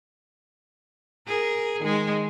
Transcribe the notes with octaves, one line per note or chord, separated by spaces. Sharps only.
G#4 A#4
D#3 G#3